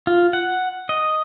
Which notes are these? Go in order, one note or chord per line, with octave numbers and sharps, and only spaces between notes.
F4
F#5
D#5